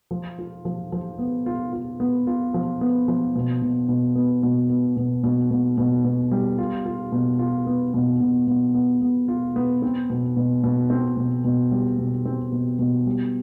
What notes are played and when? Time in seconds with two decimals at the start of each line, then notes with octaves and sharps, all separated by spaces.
0.11 F3
0.39 F4
0.65 F3
0.92 F3
1.18 B3
1.46 F4
1.73 F4
2.00 B3
2.27 F4
2.54 F3
2.81 B3
3.08 F3
3.35 B2
3.62 B2
3.89 B2
4.15 B3
4.43 B2
4.70 B3
4.97 B2
5.24 B2
5.51 B2
5.78 B2
6.05 B2
6.31 G3
6.58 F4
6.86 F4
7.12 B2
7.39 F4
7.67 B3
7.94 B2
8.20 B2
8.47 B2
8.74 B3
9.01 B3
9.28 F4
9.56 B3
9.82 C4
10.10 B2
10.37 B2
10.64 B2
10.90 C4
11.17 B2
11.44 B2
11.71 G3
11.99 B2
12.25 C4
12.52 B2
12.79 B2
13.06 G3